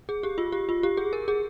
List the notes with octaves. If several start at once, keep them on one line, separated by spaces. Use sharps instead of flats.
G#4
G4
F4
G4
F4
G4
G#4
A#4
G#4